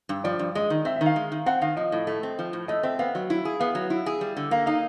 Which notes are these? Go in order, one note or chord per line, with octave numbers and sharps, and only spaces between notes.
G2
F3 D5
G2
G#3 D#5
D#3
C4 E5
E5
D#3
F5
G#3
D#3
C4 F#5
D#3 F5
F3 D#5
A2
A3
C4
F3
A2
A3 D#5
C4 E5
B3 F5
F#3
E4
G#4
B3 F5
F#3
E4
G#4
G3
D3
A#3 F5
D#4 F5